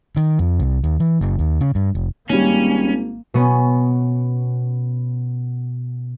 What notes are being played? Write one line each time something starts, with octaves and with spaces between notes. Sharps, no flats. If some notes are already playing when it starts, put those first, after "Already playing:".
D#3
F2
C2
D#2
E3
F#1
D#2
C#3
G2
F1
G#1 D#3 G3 A#3 C#4
B2 B3 C#4